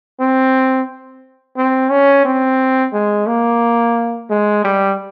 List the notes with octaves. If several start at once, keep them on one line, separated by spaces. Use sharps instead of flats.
C4
C4
C#4
C4
G#3
A#3
G#3
G3